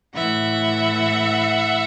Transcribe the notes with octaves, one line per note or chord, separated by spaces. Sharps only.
A2 E3 E5 F#5